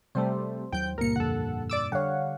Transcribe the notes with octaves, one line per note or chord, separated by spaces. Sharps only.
C3 G3 A3 C5
D#2 F#3 G5 G6
C#2 G2 A#2 A#3 A#4 C#7
F2 D3 A4 F#5
D5 D6 E6
D3 G3 C#5 F5 F#5